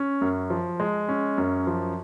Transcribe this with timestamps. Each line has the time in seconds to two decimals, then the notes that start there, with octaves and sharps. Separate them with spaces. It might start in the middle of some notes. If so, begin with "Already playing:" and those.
Already playing: C#4
0.21 F#2
0.50 F3
0.80 G#3
1.09 C#4
1.38 F#2
1.67 F3